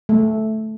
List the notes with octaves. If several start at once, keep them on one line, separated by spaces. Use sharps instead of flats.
A3